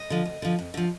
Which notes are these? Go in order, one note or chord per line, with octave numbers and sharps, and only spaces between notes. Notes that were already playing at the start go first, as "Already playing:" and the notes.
Already playing: D#5
D3 F3
D2
D3 F3
F2
D3 F3